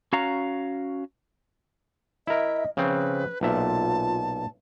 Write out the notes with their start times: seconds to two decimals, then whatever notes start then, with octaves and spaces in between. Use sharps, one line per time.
0.13 C#4 F#4 F5 A#5
2.27 E4 A#4 D#5 E5
2.77 C#3 F3 C4 B4
3.41 B1 A#2 F4 E5 A5